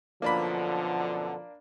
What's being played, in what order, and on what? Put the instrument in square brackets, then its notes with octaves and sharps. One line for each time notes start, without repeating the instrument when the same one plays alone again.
[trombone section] F#2 B2 D3 [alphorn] F3 [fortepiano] A#3 D4 B5